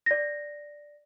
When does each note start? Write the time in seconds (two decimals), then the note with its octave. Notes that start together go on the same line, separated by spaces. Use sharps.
0.06 D5 A#6